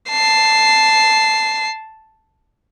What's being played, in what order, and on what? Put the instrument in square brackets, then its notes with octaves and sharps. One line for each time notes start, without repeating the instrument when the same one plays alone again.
[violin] A5 C7